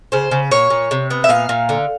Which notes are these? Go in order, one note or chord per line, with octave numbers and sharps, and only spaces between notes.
C#3 C5
C#3
A#2 C#5
A#2
C3
B3
E5
A#2 F5
A#2
D3